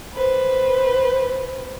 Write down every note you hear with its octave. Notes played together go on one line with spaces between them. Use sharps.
B4 C5